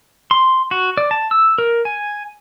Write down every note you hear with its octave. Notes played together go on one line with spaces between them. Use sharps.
C6
F#4
D5
A5
E6
A#4
G#5